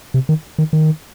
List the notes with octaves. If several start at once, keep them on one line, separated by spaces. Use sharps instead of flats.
C3
D#3
D#3
D#3